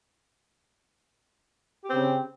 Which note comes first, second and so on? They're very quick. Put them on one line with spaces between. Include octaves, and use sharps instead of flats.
G4 C4 C#3